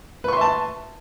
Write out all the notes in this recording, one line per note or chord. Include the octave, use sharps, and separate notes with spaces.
B4 E5 A5 C6 C#6